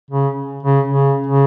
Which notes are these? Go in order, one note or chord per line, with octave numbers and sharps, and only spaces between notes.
C#3
C#3
C#3
C#3